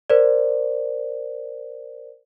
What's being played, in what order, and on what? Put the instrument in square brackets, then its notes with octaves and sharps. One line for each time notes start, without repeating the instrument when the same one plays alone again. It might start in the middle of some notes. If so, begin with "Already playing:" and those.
[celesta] A#4 C5 D5